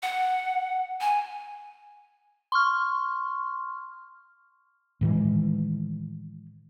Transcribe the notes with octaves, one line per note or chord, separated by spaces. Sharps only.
F#5
G#5
C6 C#6 F6
A2 D#3 E3 G#3